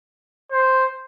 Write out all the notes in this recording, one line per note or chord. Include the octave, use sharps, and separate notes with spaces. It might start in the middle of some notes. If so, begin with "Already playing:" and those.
C5